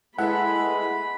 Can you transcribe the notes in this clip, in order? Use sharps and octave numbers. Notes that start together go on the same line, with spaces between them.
G#3 E4 A4 B4 E5 F#5 B5